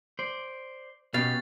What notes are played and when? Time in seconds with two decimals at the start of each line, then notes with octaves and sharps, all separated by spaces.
0.19 C5 D5
1.14 B2 C#4 G4 F5 A6